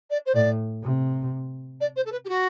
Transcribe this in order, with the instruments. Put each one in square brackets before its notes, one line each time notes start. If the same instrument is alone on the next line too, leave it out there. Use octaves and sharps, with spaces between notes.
[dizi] D5
C5
[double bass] A2 [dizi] D5
[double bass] C3
[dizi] D5
C5
A4
B4
G4
F#4